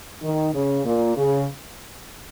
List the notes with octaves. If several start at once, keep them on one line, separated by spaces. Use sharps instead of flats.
D#3
C#3
A#2
C#3